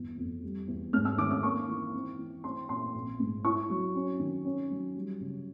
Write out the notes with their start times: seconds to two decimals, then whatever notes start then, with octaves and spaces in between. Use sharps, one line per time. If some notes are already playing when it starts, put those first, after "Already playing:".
Already playing: G1 E2
0.18 F2
0.43 G3
0.68 E2
0.93 G#2 F6
1.05 E6
1.18 D#3 D6
1.31 D6
1.43 A#3 C#6
1.68 E3
1.94 C4
2.19 E3
2.44 C4 C6
2.69 A#2 C6
2.94 A#1
3.20 G#2
3.44 E4 C#6
3.69 F#3
3.95 C#4
4.19 D#3
4.45 C#4
4.70 F#3
4.95 G3
5.20 C#3